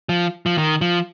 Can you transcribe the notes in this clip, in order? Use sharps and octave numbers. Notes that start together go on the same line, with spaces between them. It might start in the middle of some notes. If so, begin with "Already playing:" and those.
F3
F3
D#3
F3